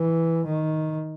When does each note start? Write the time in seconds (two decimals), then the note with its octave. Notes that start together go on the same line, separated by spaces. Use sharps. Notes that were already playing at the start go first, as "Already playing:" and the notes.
Already playing: E3
0.46 D#3